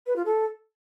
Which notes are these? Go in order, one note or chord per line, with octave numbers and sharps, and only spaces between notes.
B4
F4
A4